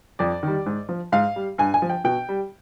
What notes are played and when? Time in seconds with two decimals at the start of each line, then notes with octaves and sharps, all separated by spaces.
0.19 F2 D5
0.43 D#3 G3
0.66 G#2
0.89 F3
1.12 G#2 F5
1.36 G3
1.58 G2 G#5
1.74 G#5
1.82 F3
1.90 G5
2.04 B2 G5
2.29 G3